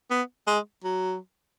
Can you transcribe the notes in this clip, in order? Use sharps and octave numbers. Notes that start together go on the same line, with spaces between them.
B3
G#3
F#3